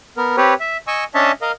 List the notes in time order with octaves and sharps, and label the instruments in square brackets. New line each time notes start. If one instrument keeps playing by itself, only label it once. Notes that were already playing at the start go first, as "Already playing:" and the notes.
[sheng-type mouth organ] B3 A#4
C4 G4 B4 C#5
E5
D#5 G#5 C#6 E6
C#4 D4 C#5 D#5 E5 A5
A#4 D#5 F5